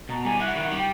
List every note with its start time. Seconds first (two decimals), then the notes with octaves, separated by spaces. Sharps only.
0.09 B2 A#5
0.25 G3 G#5
0.40 E4 F#5
0.55 D#3 F#5
0.71 G3
0.78 G5